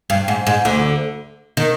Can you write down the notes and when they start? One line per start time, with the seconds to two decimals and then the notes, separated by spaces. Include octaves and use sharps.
0.10 G2
0.28 G#2
0.47 G#2
0.65 D2 D3
1.57 D#3